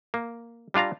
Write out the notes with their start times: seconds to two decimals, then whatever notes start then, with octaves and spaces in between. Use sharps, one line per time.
0.14 A#3
0.74 G3 D4 F4 F5 A#5